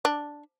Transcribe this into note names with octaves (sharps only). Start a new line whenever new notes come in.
D4